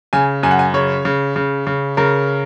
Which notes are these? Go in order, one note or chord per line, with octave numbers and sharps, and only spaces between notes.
C#3 G#5
F#2 G#5
F#5
G#5
C#3 C#5
C#3
C#3
C#3
C#3 A#4